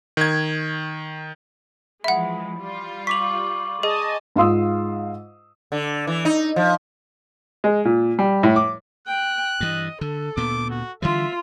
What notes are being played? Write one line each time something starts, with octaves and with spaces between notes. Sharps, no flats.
D#3 G#6
E3 F3 G#3 E5 F#5 B5
G3 F4
C#6 D6 B6 F7 F#7
G#4 D#5 G#5 A5
G#2 F4 F5 C6 D#6 E6
D3
E3
D#4
F3
G#3
A#2
G3
A2
D6
G5 F#6
G2 E3 D#5
D3 A4
D2 A#2 B3 D6
F#4
D3 E3 G3 F4 E5